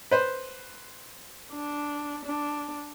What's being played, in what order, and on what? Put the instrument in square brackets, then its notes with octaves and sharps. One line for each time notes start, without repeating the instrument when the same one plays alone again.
[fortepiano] B4 C5
[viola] D4
D4